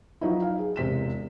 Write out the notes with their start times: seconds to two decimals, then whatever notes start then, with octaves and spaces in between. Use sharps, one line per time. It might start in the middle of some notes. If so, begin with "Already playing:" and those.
0.21 F3 F#3 D#4 E4
0.42 F5
0.59 G#4
0.76 E1 C3 B6 E7